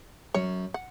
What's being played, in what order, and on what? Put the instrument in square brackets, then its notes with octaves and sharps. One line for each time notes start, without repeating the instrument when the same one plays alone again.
[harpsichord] F#2 [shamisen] C#5
[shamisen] F#5